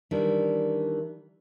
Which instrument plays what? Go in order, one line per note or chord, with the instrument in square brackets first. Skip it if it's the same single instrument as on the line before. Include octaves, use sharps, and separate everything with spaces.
[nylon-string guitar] D#3 E3 G3 D4